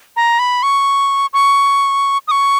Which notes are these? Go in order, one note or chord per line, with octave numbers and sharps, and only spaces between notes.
A#5
B5
C#6
C#6
D#6
C#6